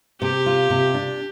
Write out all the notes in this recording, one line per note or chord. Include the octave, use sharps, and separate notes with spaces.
C3 G4
F4
C3
D4